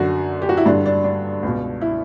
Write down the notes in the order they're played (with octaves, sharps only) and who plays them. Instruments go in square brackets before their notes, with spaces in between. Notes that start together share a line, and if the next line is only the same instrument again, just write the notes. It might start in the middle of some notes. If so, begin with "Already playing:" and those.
Already playing: [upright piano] F#2 D3 F#4
G4
F#4
E4
G2 D3 D4
D4
D4
C#2 B2
E4